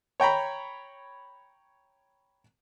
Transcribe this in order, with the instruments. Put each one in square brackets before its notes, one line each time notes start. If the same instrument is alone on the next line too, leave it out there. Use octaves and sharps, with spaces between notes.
[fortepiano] C#5 G5 A#5 B5